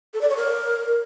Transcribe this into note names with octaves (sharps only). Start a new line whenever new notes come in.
A4
D5
C#5
A#4